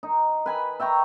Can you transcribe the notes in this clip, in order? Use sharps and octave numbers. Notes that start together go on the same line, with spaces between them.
D#4
B4 G#5 B5
E5 G5 A#5 C#6